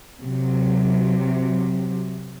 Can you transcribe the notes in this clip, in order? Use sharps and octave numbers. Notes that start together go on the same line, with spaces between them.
C3 F#3